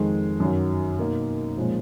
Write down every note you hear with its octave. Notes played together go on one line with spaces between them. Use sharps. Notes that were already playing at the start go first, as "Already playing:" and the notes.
Already playing: F2 D#3 G#3
F#2 D#3 F#3
B2 A#3 D#4
A#2 F3 G#3 C#4